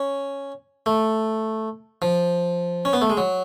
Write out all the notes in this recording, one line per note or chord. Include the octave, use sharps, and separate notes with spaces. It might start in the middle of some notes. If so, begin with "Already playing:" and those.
Already playing: C#4
A3
F3
C#4
B3
A3
G#3
F#3